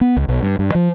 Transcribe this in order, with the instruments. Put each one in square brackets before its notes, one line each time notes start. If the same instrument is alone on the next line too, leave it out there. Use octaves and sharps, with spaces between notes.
[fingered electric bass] B3
C#2
B1
G2
G2
F3